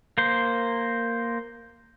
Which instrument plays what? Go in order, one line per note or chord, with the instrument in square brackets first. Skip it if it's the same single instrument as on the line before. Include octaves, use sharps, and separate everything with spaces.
[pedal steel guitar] A#3 C5